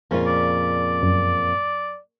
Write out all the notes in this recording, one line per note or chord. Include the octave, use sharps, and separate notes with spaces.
F2 A#2 C#3 C#4 F4
D5
F#2